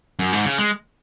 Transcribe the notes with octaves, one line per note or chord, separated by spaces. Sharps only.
F#2
G#2
C#3
G#3